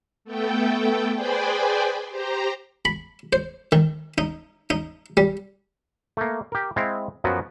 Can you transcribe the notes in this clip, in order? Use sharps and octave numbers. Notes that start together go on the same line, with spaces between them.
A3 B3 A4 G5
G#4 B4 C5 D5 G5 G#5
G4 C5 A#5
B5
C5
D#3
D#4
D#4
G3
A3 A#3
G4 A#4
G#3 C4 E4 F5
F#2 F3 F#3 B3 F#4